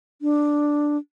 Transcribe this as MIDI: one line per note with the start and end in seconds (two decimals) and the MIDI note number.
0.22 0.97 62